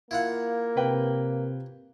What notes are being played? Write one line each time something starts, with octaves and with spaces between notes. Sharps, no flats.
A#3 E4 F4 F#5
C3 B4 G5